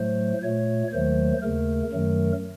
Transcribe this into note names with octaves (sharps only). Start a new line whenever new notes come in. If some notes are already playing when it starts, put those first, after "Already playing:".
Already playing: A2 F#3 A3 C5
A#2 A3 C#5
D#2 D#3 F#3 A3 C5
D#2 C#3 A3 A#4
F#2 D#3 F#3 A3